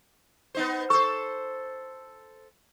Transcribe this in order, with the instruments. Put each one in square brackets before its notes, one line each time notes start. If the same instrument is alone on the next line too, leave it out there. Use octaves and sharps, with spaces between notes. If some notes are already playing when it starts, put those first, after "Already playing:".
[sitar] B3 D#4 C5
[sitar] A4 C5 [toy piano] C#6